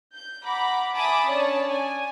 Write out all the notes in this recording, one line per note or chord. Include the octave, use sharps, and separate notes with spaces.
G6
F#5 A#5 B5 D6
E5 G#5 A5 B5 D6 D#6
C#4 D4 C#5 D5 A5
G#5